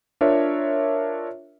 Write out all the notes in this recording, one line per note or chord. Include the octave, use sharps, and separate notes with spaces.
D4 F4 A#4 C#5 E5